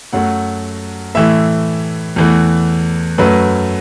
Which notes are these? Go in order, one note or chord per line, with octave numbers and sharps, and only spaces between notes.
F#2 F#3 A3 F#5
A2 E3 A3 E5
E2 E3 A3
F#2 F#3 A3 B4